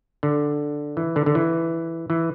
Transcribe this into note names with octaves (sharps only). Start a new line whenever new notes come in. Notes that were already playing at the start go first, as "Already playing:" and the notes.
D3
E3
D3
D3
E3
E3